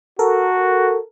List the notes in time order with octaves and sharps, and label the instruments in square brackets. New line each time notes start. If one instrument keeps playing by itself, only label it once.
[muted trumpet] F#4 [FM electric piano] A4 A#4